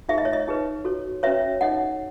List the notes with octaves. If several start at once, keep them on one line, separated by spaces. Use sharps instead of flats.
D#4 G#4 B4 E5
D#5
C#5
D#5
D#4 G#4 B4
F#4 A4 C#5
C#4 F#4 B4 C#5 E5
D#4 A4 C#5 D#5 F#5